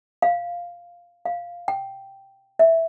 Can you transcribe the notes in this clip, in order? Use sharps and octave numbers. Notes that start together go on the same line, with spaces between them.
F5
F5
G5
E5